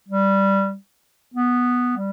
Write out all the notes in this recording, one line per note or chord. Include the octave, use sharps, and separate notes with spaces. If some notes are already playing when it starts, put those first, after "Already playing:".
G3
B3
G3